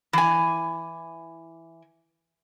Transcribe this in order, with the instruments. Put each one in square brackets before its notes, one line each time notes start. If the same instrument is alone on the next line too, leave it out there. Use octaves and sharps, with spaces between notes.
[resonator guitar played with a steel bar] E3 G#5